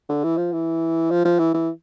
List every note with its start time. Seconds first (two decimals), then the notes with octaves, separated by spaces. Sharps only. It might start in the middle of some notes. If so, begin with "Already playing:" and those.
0.09 D3
0.24 E3
0.37 F3
0.53 E3
1.11 F3
1.25 F3
1.39 E3
1.54 E3